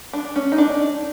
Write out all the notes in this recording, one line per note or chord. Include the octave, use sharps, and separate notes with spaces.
D4
C#4
D#4
D4